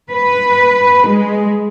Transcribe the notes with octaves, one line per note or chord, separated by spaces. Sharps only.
B4
G#3